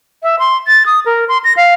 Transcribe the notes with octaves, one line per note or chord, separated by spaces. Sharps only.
E5
C6
A6
D#6
A#4
C6
A#6
F5